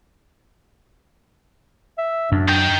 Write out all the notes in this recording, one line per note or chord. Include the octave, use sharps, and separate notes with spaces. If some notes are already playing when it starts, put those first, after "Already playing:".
E5
F#2 D4
D#4 G5